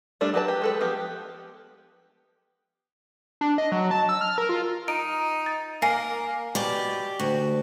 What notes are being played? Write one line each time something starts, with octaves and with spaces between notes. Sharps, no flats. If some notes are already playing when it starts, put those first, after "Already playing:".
G3 A3 D4 A#4
F#3 G4 B4 A5
G4
G#3 A4 B4
F3 B3 G4
D4
D#5
F#3
A5
E6
F6
A#4
F4
D#4 D7
A6
A#3 A#4 G#5 A#6 C7
B2 G4 D5
D2 F#4